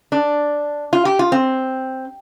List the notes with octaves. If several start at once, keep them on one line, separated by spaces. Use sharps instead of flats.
D4
F4
G4
F4
C4